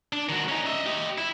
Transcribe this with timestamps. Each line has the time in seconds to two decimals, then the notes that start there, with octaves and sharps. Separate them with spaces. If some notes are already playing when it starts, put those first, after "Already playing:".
0.13 D4
0.29 D#3 F#4
0.49 C#4 D#4
0.66 D#5 E5
0.86 G4 D#5
1.18 E4